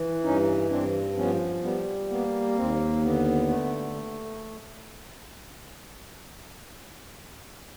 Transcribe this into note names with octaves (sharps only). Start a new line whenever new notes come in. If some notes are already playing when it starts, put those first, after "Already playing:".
Already playing: E3
G2 C#4 D#4
G2 C4 D4
F3 B3 C#4
G3 B3
A#3 B3
D#2 C4
D3 B3
A3